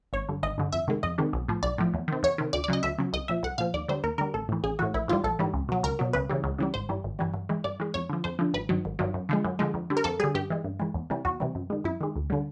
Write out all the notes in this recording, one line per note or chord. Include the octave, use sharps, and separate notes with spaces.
G#1 C#5
G2 D3
G#1 D#5
G2 D3
F2 E5
C3 D#3 G#3
F2 D#5
C3 D#3 G#3
B1
A2 F3
B1 D5
A2 F3
E2
C3 D#3
E2 C#5
C3 D#3
D2 D5
D5
C#3 F#3 D#5
D2 E5
C#3 F#3
C2 D#5
A#2 F3 E5
C2 F#5
A#2 F3 F5
D#2 D5
D3 G3 C5
D#2 A#4
D3 G3 A#4
A1 A4
A2 E3
A1 G#4
A2 E3 F#4
A#1 E4
G#2 E3 G3 F4
A#1 A4
G#2 E3 G3
C#2
B2 F#3
C#2 A#4
B2 F#3
C#2 B4
C#3 E3 G3
C#2
C#3 E3 G3
G#1 C5
G2 E3 G3
G#1
G2 E3 G3
G2
E3 G#3
G2 D5
E3 G#3
F2 C#5
D3 F3
F2 C5
D3 F3
G#1 B4
G2 D#3 F#3
G#1
G2 D#3 F#3
F#2
D3 F3 G#3
F#2
D3 F3 G#3
F2
D3 G3
A#4
F2 A4
D3 G3 G#4
G2 G4
E3 G#3
G2
E3 G#3
E2
C3 E3 G3
E2 F#4
C3 E3 G3
F#2
D#3 G#3
F#2 E4
D#3 G#3
D2
D3 G3